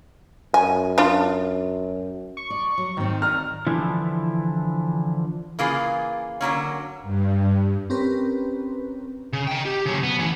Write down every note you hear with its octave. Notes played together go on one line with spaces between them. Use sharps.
F#2 G#5
D4 F4
C#6
D5
F#3
G#2 D#3 C4
D5 A#5 F6
D3 E3 F3 D4 E4
C#3 E3 A#3 F4 G#4
D3 F#3 A#3 C#4
G2
C4 C#4 G4 A#4 B4
C#3
D#5 G5
G4
C#3 F#3
B3
A2 E3